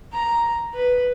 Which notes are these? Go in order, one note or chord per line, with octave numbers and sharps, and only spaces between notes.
A#5
B4